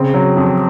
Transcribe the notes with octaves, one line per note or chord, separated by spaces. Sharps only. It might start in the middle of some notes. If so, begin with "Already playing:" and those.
Already playing: C#3 C4
F#3
F2